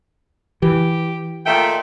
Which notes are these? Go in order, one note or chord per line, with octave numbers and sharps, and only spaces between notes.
E3 G4
A#2 D#3 A3 G5